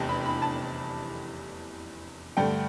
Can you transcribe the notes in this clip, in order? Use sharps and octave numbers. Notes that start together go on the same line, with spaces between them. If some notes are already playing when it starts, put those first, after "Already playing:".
Already playing: F1 E2 C3 G5 A5
B5
B5
A5
G2 D3 A3 G5